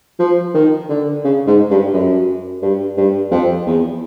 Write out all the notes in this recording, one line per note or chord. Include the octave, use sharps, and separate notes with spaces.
F3
D#3
D3
C#3
G#2
G2
F#2
G2
G2
F2
E2